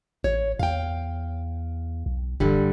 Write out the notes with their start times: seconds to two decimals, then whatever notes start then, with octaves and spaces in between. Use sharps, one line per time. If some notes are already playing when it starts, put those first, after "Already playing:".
0.24 A1 C#5
0.59 E2 F5 G5
2.06 B1
2.40 E1 G2 D3 G3